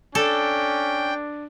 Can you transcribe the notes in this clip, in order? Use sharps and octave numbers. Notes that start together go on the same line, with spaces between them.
C#4 D4 A4 G5